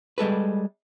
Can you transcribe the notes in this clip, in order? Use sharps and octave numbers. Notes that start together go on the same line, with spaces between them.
G3 G#3 A4 B4